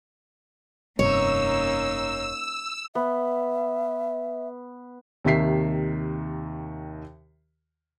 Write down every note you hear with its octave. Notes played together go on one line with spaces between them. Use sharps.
F1 G2 C3 A#3 C#4 D#4 C#5 E6
B3 E5
D#2 C3 D#3 E5 B6 C7